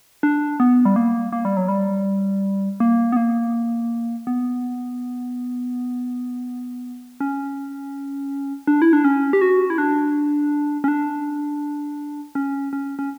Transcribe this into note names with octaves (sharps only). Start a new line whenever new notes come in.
D4
B3
G3
A#3
A#3
G3
F#3
G3
A#3
B3
A#3
B3
C#4
D4
E4
D4
C#4
G4
F#4
E4
D4
C#4
D4
C#4
C#4
C#4